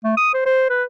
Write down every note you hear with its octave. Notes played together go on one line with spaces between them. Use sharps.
A3
D#6
C5
C5
B4